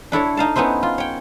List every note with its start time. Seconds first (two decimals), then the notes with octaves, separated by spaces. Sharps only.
0.12 D4 E4 A4 C#5
0.37 D#4 F5 A5
0.56 B3 C#4 D#4 E4 C5
0.83 F4
0.98 C#5 G5